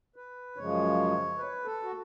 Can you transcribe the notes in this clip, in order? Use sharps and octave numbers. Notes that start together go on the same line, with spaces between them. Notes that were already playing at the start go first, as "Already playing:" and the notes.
B4
F#2 C#3 F3 G#3 C#5
B4
A4
F#4